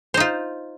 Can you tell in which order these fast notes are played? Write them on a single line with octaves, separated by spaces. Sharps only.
C5 D#4 F4